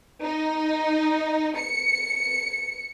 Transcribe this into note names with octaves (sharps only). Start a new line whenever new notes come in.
D#4
C#7